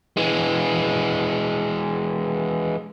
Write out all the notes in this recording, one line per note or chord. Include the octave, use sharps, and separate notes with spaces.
E3 G#3